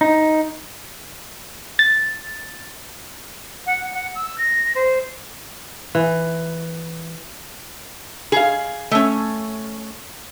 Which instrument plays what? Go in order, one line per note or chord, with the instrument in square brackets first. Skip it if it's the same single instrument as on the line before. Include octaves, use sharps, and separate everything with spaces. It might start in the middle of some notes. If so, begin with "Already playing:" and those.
[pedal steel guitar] D#4
[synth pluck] A6
[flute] F#5
F#5
E6
A#6
C5
[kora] E3
[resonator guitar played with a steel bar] G#4 F5
A3 C#4